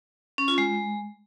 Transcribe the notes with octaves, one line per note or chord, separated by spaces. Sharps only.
C#4
F4
G#3